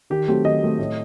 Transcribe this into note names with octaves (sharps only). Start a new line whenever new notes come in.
D#3 G4
F#3 A3 C4 G4
D#3 D#5
F#3 A3 C4
A2